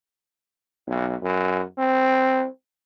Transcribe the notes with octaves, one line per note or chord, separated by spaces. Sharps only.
B1
F#2
C4